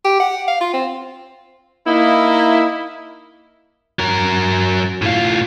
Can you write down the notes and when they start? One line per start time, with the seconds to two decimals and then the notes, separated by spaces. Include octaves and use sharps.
0.05 G4
0.20 F#5
0.48 F5
0.61 F4
0.73 C4
1.86 A#3 D#4 E4
3.99 F#3 A#4
5.02 A2 F4